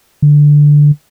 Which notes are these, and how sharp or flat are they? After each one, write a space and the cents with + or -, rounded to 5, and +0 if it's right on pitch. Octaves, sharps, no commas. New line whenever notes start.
D3 +0